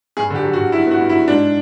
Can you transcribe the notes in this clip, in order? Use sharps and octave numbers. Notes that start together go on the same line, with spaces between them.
G2 G#4
D3 G4
F#3
F#4
D3
F#3 E4
B3
F#4
G2
E4
F#3
G#2 D4